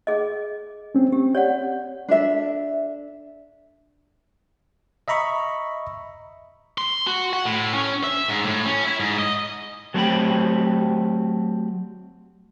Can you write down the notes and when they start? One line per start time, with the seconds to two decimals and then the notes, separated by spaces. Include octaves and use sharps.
0.07 G#4 D#5
0.95 C4 C#4
1.12 C4 G4
1.35 G4 C#5 D5 F#5
2.09 D4 A4 E5
5.08 D#5 E5 A#5 B5 C#6
6.78 C6
7.07 F#4
7.33 F#5
7.45 A2
7.74 C#4
8.04 E5
8.28 G#2
8.45 A2
8.66 C#4
8.84 E4
9.00 G#2
9.19 D#5
9.94 F#3 A3 C4 G4 G5 B5